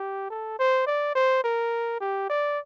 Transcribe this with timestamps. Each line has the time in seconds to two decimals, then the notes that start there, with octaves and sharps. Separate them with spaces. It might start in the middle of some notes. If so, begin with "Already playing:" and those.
Already playing: G4
0.30 A4
0.59 C5
0.87 D5
1.15 C5
1.44 A#4
2.01 G4
2.29 D5